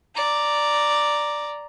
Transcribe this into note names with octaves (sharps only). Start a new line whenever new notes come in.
D5 A#5